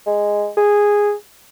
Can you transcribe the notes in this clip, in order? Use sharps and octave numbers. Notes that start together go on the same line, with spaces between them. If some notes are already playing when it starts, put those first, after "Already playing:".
G#3
G#4